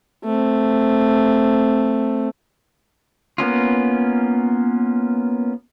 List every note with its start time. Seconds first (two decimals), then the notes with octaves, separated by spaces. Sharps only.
0.25 A3 C4
3.38 A#3 B3 C#4 F4